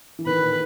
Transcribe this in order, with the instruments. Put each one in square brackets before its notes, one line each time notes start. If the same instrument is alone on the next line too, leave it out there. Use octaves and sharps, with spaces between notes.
[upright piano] E3
[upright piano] D#3 [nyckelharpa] B4
[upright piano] A#2